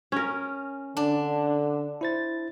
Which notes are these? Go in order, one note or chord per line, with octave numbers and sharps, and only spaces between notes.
C#4 A#4
D3 D4
E4 C5 A6